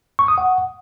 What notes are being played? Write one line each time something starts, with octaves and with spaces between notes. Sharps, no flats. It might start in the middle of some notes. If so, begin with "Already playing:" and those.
C#6
D#6
F#5